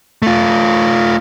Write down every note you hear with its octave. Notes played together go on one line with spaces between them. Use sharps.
A3 F4